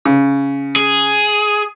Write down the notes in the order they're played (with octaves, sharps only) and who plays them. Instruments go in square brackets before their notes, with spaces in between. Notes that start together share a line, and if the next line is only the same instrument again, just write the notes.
[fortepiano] C#3
[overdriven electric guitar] G#4